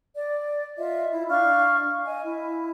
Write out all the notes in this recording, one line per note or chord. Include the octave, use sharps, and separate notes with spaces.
D5
F4 D#5 E5
E4
D4 F5 C#6 F6
D#5 G#5
E4